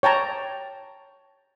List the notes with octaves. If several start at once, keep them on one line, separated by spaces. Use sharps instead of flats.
C#5 G5 A5 A#5